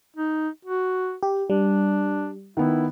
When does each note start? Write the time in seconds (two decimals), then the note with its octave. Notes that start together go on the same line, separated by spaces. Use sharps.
0.17 D#4
0.65 F#4
1.23 G4
1.50 G3 D4
2.57 D#3 B3 E4